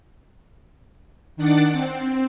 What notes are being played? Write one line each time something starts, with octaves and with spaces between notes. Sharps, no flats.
D#3 D4 F#5 D6 A6
C4